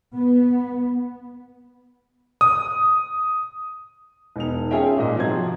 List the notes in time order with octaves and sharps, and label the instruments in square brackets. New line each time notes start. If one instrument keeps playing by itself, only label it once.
[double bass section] B3
[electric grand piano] D#6
[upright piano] E1 D#4 F7
C#4 F4 G#4 C#5 E5 G5
G#1 A#2 D#5
C3 F3 F#3 C5 G#6